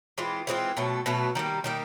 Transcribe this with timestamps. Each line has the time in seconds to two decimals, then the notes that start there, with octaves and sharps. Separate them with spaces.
0.18 E3 G#3 C4 F4
0.47 E3 G#3 C4 F4
0.77 B2 F#3 A3
1.06 B2 F#3 A3
1.35 D#3 G3 A#3
1.64 D#3 G3 A#3